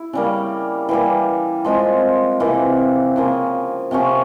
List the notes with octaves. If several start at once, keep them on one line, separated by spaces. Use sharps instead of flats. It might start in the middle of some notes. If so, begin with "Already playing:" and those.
Already playing: E4
C#3 G3 A#3
E3 G3 A#3
F3 G#3 C4 F4
C3 E3 A#3
C#3 F3 A#3
C3 F3 A#3 C#4